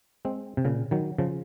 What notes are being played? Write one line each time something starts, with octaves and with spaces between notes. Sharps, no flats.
G#3 C4
C3
A#2 C#3
D#3 F#3
C#3 F3